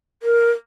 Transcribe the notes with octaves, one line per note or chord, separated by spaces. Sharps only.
A#4